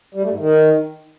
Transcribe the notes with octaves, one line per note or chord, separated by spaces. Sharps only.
G3
A3
G#2
D#3